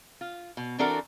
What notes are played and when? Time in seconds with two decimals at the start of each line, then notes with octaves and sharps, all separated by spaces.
0.21 F4
0.57 B2
0.78 E3 C4 D4 F#4 A4 A#4